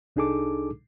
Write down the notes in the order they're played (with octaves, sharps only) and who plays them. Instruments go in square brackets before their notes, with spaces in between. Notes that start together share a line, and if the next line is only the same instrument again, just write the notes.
[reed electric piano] C2 D4 D#4 G#4 A4 D6